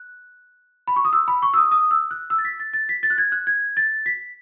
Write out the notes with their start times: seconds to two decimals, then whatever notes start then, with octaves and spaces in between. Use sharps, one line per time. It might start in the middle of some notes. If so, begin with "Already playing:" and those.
Already playing: F#6
0.88 B5
0.96 C#6
1.05 D#6
1.13 E6
1.28 B5
1.42 C#6
1.54 E6
1.57 D#6
1.71 D#6
1.91 E6
2.11 F#6
2.30 E6
2.38 A6
2.45 B6
2.60 A6
2.73 A6
2.89 B6
3.03 A6
3.10 F#6
3.18 G#6
3.32 F#6
3.47 G#6
3.77 A6
4.06 B6